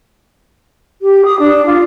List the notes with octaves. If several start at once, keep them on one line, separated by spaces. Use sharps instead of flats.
G4
D#6
D4
F4